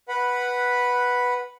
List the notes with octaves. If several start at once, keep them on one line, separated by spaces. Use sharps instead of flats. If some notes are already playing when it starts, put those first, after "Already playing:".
B4 F#5 B5